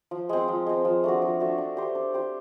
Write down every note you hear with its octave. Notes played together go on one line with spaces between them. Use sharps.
F3
G#3 C4
F3
G#3 C4
F3
A3 D4 F#4
F3
A3 D4 F#4
D4
G4 C5
D4
G4 C5